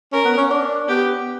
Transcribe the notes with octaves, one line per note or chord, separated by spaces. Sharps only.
C#4 A#4
B3
C#4
D4
B3 G4